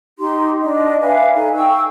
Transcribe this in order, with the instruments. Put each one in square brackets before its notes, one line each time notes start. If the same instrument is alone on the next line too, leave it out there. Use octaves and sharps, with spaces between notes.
[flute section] D#4 G4 C6
D4 D#5
B4 E5 F5 G#5
D#4 A4 G#5
G5 C#6 E6